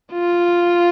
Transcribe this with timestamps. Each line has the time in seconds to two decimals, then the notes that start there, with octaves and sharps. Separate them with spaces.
0.13 F4